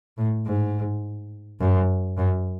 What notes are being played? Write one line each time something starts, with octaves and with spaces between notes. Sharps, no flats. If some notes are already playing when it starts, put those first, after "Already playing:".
A2
G#2
F#2
F#2